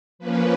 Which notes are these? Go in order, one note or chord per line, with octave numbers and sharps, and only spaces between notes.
F3 A#3 C#4 B4